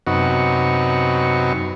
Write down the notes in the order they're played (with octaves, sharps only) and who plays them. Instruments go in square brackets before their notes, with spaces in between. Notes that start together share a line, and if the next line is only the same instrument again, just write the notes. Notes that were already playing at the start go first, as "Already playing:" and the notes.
[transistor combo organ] F#2 C3 B3 D#4 F#4 C#6